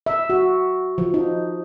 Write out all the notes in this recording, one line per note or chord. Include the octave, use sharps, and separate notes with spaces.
E5
F#4
F3
D#4